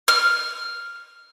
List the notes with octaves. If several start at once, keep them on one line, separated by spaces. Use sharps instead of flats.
F6